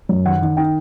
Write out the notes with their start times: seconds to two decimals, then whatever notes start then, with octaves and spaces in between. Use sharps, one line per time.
0.09 F#2
0.25 D#3 F#5
0.42 D#3
0.57 D#4 G5